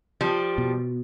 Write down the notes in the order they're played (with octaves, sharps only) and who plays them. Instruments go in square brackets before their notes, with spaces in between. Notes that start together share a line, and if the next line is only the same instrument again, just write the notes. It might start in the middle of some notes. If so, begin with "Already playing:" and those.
[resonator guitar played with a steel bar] F3 G3
[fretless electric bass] B2